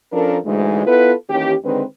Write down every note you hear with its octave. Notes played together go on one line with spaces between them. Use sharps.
F3 C#4 D4 A4 A#4
D2 G#2 E3 G#3
B3 E4 F4 A4 B4
D#2 E3 C#4 G4
D3 D#3 G#3 C4 B4